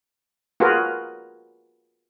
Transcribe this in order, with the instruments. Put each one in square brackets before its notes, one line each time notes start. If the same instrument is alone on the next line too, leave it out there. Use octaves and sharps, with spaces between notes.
[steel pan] F4 F#4 G#4 A#4 B4